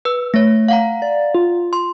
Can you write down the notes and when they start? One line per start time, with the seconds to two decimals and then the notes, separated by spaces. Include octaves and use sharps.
0.05 B4 E6
0.34 A3 C#5 A#6
0.68 F5 F#5 A#5
1.02 D5
1.35 F4
1.73 C6